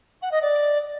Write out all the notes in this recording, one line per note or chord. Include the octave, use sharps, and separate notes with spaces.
F#5
D#5
D5